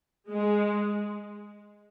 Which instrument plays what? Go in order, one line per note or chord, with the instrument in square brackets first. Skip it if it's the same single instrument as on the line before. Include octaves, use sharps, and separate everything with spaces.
[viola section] G#3